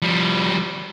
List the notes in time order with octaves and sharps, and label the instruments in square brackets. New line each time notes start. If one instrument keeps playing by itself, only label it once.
[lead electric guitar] F3 G3